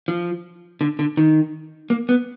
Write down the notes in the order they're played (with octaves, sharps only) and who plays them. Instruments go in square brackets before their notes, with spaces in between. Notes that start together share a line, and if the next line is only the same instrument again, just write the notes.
[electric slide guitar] F3
D3
D3
D#3
A#3
B3